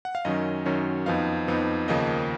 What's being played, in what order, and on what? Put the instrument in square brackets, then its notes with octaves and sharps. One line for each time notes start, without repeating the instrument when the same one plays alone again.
[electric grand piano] F#5
F5
F#2 D#3 F#3 C#4 D#5
F#2 D#3 F#3 C#4
F2 F3 B3 D#4 F5
F2 F3 B3 D#4
D#2 C#3 F3 A#3 D#5